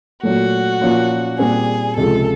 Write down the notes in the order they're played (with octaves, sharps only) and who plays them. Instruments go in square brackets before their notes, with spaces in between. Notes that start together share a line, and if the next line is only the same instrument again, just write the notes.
[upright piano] A#2 F#3 A3 [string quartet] F#4
[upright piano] A#2 F3 A#3 C#4 F4
[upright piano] A#2 G3 C4 [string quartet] G#4
[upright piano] C#2 C3 F3 G#3 [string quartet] A4